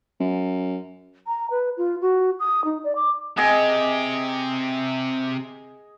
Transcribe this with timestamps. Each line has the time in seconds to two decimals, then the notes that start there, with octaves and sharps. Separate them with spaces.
0.20 F#2
1.27 A#5
1.51 B4
1.77 F4
2.01 F#4
2.40 D#6
2.65 D#4
2.84 D5
2.95 D6
3.38 C3 G4 G#4 D#5 G#5